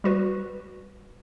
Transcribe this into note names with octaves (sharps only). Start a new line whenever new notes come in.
G3 F#4 B4